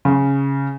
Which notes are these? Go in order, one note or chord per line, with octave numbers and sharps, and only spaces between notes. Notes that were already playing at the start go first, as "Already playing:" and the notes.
C#3